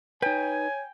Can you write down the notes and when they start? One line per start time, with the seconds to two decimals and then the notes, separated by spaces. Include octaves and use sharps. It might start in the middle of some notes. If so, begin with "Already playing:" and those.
0.22 D#4 B4 C#5 G5 G#5